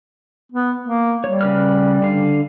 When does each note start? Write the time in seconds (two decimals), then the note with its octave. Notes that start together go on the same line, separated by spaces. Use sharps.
0.52 B3
0.83 A#3
1.24 G3 C#5
1.41 C#3 B4 F6
2.02 D3 F5